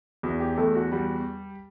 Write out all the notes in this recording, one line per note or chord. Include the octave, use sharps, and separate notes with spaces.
E2 F#4
G4
E2 A3 A4
F#4
G3 F#4